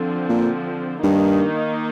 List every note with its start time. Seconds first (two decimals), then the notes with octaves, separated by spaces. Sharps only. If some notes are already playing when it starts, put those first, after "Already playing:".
Already playing: D3 F3 C4
0.29 A#2
1.03 G2 D#3 A#3 D#4